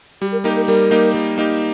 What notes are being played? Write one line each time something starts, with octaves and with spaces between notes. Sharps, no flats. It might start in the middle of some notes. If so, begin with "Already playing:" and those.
G3 G4
A#4
A#3 D#4 G4 A#4
A#4
G3 A#4
A#3 D#4 G4
G3
A#3 D#4 G4